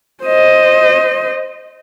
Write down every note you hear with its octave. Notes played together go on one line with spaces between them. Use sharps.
C5 D#5